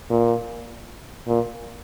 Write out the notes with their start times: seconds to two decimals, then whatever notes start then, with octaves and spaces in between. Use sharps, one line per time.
0.10 A#2
1.28 A#2